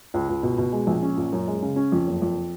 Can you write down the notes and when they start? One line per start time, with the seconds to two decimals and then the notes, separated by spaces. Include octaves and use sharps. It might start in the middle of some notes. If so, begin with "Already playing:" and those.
0.14 C#2
0.29 C#2
0.43 B2
0.58 B2
0.72 G#3
0.87 A#1
1.03 C#4
1.17 A#2
1.33 F#2
1.48 G#3
1.62 C#3
1.76 C#4
1.92 F2
2.07 F#1
2.22 F2